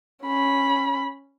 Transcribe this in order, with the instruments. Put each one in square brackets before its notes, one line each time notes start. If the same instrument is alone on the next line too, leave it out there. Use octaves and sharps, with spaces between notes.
[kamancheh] C#4 B5